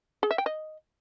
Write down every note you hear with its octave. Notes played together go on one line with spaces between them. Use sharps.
G#4
E5
G5
D#5